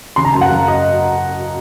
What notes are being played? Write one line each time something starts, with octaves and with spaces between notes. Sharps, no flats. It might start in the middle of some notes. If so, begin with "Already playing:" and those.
C#3 C6
A#5
F#2 A5
F#5
F#2 F5
D#5